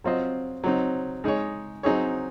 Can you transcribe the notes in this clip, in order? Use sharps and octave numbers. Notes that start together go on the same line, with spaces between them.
F#3 C4 F4 C5 D#5
F#3 C4 D#4
G#3 D#4 G#4 C#5
F#3 C4 D#4 G#4 C#5